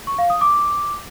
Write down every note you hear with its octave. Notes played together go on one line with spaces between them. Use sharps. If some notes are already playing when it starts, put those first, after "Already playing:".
C#6
F5
D#6
D6